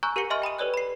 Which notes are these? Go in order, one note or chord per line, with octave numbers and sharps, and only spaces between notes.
G#5 A#5 C#6 E6 F#6 G6
G4 A#4 F#5 A#6 C#7 G7
D#5 E5 G#5 C6 C#6 F6
G5 B5 D#6 D#7
G4 A4 B4 C#5 D5 F#6
B5 C7